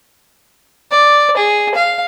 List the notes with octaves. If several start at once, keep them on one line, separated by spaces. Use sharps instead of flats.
D5
G#4
F5